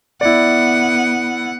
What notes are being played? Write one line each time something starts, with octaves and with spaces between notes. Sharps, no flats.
B3 E4 D5 F#5